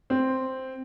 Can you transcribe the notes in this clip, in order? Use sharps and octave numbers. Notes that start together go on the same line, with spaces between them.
C4